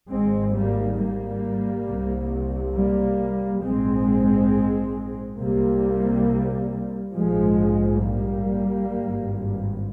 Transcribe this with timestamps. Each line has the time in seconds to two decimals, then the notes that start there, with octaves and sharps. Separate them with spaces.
0.11 G#1 G#2 G#3 C4
0.55 G3 A#3
0.98 G3 A#3
1.87 C2 C3
2.74 G3 A#3
3.63 A#1 G#2 G#3 C4
5.38 C2 C3 G3 A#3
7.14 A#1 G#2 F3 G#3
8.02 G3 A#3
8.90 G#1 G2